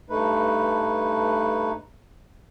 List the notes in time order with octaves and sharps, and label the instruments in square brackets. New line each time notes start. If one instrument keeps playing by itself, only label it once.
[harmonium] G2 A3 D#4 B4